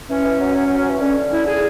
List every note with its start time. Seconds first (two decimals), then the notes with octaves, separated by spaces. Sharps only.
0.09 E3 C#4
0.24 E3
0.40 F#3
0.55 F#3
0.66 F#3
0.78 F#3
0.90 E3
1.01 D3 C#4
1.32 E4
1.47 G#4